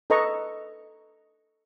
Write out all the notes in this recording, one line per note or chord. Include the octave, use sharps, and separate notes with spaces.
A4 B4 D#5 A#5 C#6